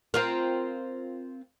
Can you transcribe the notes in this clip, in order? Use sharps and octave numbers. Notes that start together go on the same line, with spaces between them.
C4 F4 A#4